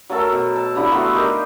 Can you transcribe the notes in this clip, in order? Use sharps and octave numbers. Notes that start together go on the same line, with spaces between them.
F#3 A3 A4 A#4
B2
A5
D3 E4 G4 A#5
A3 B3 F4 F#4
D#4 G4 A#4